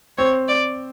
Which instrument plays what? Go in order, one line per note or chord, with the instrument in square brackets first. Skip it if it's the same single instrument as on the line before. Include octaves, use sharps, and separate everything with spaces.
[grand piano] C4 [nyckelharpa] C#5
[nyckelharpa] D5